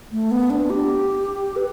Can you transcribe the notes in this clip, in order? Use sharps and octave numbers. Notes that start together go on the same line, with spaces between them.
A3
B3
D4
G4
B4